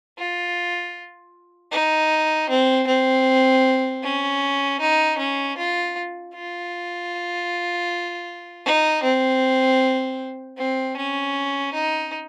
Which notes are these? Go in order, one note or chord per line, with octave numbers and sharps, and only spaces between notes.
F4
D#4
C4
C4
C#4
D#4
C#4
F4
F4
D#4
C4
C4
C#4
D#4